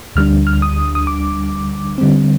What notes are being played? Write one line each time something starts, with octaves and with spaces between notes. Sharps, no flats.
D2 D3 G3 D4 F6
F6
D#6
D#6
D6
D3 G3 C4